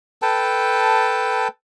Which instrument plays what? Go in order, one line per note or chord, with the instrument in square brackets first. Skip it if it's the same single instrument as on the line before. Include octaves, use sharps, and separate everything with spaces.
[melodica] A4 B4 G5 A5